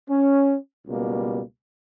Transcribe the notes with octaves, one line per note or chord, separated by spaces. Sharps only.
C#4
C#2 B2 G3 A#3